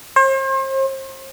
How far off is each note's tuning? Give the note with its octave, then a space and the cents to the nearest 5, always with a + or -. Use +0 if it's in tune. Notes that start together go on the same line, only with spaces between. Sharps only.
C5 +40